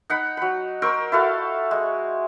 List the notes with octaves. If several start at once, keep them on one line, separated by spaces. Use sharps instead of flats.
D#4 F#5 B5
F#3 B5
A#4 C5 C#6 E6
E4 F#4 A4 F5
G#3